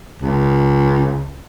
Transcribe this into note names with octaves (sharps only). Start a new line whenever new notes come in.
C#2